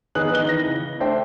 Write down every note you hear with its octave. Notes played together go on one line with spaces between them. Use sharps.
D#3 B3 G#4 D#5 F#6 F#7
D#3 B3 D#5 F#6 G7
E3 A#6
C#3
A3 D4 C5 E5 G5